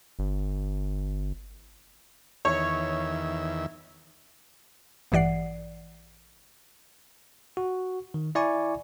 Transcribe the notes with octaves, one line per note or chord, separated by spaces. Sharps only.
G1
E2 D#3 C#5 E5
A1 G2 E3 D5 F#5 C7
F#4
D#3
E4 D5 G#5 C#6